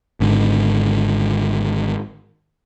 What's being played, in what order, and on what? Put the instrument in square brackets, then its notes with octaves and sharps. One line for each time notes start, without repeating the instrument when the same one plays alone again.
[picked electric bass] G#1 G#2 D3